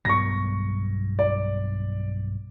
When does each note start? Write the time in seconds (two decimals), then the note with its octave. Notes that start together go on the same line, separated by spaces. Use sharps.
0.05 B1 G2 B3 C#6 A#6
1.19 D5